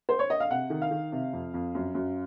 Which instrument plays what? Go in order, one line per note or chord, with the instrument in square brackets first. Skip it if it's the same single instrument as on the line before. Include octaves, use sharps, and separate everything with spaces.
[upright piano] C5
C#5
D#5
F5
C3 F#5
D#3
F5
D#3
C3
F2
F2
F#2
F#2